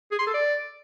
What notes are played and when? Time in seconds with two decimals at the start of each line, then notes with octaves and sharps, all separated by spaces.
0.11 G#4
0.19 C6
0.26 A4
0.34 D5